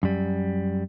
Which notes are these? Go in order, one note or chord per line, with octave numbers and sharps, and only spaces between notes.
F#2 G3